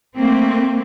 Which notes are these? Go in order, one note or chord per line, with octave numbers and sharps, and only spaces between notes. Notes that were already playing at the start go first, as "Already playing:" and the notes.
A3 A#3 C4